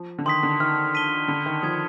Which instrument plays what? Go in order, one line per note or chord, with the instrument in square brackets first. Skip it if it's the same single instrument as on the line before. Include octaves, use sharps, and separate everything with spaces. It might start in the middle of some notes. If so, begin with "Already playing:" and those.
Already playing: [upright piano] F3
D3
[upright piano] D#3 [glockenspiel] C6 D#6 B6
[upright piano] D3
[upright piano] D#3 [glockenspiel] F6
[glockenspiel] B6 D#7 G7
[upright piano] D3 [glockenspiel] B5
[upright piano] D#3
[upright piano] F3 [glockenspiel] D#6 G#6 B6